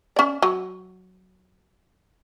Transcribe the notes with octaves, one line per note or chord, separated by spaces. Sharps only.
C#4 D5
F#3